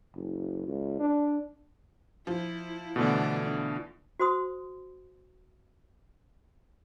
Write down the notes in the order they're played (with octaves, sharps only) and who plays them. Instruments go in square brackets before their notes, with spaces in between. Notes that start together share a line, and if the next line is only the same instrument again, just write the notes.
[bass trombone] F#1
C#2
D4
[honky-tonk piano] F3 [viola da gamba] E4
[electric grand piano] B2 D3 E3 [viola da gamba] A3 B3 D4
[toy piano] F#4 C5 C6 D#6